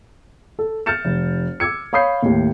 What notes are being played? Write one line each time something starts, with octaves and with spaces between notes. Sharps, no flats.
A4
F6 G6 A6 C#7 E7
F1
D6 E6 G#6 C#7
C#5 F5 B5 D#6 G6 C7
D#2 A2